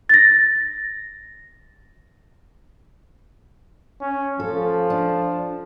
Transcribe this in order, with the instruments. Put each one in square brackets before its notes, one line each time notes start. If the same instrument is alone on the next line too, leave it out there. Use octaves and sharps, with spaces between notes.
[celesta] A6 A#6
[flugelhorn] C#4
[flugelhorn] F3 [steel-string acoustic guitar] A4
[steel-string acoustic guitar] D4